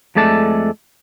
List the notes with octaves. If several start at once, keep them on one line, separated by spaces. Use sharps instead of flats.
F2 G#3 A3 D5 A5